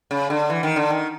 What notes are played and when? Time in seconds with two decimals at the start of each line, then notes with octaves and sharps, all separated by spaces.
0.11 C#3
0.30 D3
0.50 E3
0.63 D#3
0.76 D3
0.90 D#3